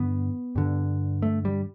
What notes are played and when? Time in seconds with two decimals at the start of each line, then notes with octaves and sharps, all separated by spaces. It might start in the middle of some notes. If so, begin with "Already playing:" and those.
Already playing: G2 D3 B3
0.56 G2 D3
1.22 A3
1.45 G3